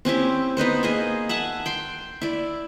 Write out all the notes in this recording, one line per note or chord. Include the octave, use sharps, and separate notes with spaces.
C4 C#4 E4 G4
B3 D#4 B4 C5
A#3 G#4 D#5
E5 F#5 G#5 A5
G5 C6
E4 D5